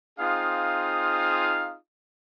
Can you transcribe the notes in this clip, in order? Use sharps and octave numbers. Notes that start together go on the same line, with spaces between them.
C4 D#4 F4 G#4 F5 D#6